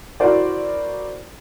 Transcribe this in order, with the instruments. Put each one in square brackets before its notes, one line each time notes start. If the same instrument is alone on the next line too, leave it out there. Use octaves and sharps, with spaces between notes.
[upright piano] E4 F#4 A#4 C5 D5